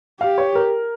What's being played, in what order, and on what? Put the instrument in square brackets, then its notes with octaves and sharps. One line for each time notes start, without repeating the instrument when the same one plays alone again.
[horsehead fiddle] G4 [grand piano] F5
[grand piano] C#5
A#4